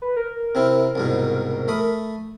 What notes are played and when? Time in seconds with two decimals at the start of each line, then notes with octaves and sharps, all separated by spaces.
0.02 B4
0.16 A#4
0.55 C3 C4 E4
0.95 C2 G#2 B2
1.68 A3 B5 D#6